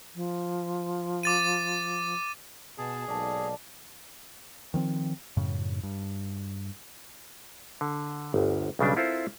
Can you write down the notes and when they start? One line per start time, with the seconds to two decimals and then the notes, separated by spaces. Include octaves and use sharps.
0.15 F3
1.23 D6 A6 D#7
2.78 B2 G#4 A5
3.08 B1 G#2 A#3 D5 A5
4.74 D#3 F3 C4
5.37 F#2 A2 C#3
5.83 G2
7.81 D3
8.34 G1 D2
8.79 B1 C#3 G3 D4
8.96 C4 E4 F4 A4 A#4 C5